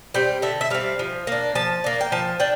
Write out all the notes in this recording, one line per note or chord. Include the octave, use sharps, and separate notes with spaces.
G3 C4 G5
D3 E5
E5
G3 C4 F5
F3
A#3 D4
F3 A5
A#3 D4
G5
F3 A5
D4 G5